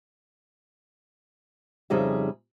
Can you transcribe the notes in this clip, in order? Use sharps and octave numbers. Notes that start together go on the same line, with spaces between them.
F2 C#3 G3 D#4 G#4 E5